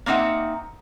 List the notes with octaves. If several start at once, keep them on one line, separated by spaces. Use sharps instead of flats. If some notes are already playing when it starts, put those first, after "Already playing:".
A#3 C4 D#4 E5 F#5